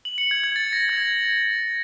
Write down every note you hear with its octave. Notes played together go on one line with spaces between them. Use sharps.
F#7
C#7
G#6
G#6
A6
A#6
G#6